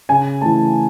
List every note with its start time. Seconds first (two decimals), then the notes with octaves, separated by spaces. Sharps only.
0.09 C#3 G#5
0.41 E3 A3 A5